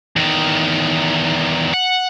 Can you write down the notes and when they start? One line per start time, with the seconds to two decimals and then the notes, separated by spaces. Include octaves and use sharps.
0.16 E2 D#3
1.74 F#5